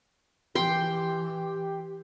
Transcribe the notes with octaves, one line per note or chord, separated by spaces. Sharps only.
E3 G4 G5 C6